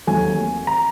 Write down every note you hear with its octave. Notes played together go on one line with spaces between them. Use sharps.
D#2 D#3 F#3 A3 C4 G#5
A#5